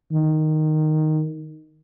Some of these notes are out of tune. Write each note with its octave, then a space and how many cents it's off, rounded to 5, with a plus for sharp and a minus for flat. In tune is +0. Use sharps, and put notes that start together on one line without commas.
D#3 -5